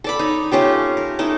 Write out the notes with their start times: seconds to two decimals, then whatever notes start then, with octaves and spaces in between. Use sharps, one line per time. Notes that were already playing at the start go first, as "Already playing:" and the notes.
0.04 A4 D5 B5
0.19 D#4 C#5
0.52 A3 C#4 F4 G4
0.97 A#4
1.19 A3 D#4 E4